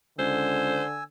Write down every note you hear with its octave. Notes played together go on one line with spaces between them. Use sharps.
C#2 D3 C5 G#5 E6